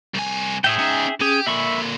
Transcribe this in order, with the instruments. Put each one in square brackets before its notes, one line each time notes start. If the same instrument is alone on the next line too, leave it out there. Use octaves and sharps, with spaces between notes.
[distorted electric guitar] C2 G#5
[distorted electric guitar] A2 [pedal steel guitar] G#4 E5 G5
[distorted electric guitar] C#4 D#4
[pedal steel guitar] C#4 G#4 [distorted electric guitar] G4
[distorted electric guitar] A#2 D3 [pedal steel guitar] E5 B5 C#6